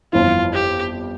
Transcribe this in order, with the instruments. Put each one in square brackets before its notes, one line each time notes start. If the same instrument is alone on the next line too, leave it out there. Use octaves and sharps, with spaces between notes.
[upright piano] G1 F2 E3 [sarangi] F4
[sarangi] G4